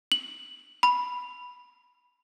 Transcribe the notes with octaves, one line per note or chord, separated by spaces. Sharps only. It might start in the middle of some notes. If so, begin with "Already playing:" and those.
F#7
B5